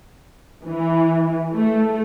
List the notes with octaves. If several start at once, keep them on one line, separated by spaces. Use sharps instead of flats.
E3
A3